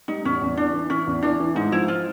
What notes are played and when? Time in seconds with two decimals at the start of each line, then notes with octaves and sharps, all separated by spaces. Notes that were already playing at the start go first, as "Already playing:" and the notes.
0.08 G3 D#4
0.25 E2 C#4
0.41 E2
0.57 E3 D4
0.73 E3
0.90 E3 C#4
1.07 E2
1.22 E3 D4
1.40 E3
1.55 G#2 D#4
1.72 F3 E4
1.88 F4